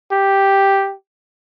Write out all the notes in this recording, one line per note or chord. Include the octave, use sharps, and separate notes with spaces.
G4